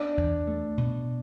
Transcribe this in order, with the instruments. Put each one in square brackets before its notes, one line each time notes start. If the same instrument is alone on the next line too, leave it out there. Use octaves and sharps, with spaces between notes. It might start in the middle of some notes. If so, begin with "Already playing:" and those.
Already playing: [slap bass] B3 [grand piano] D4
[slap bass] E2
A3
B2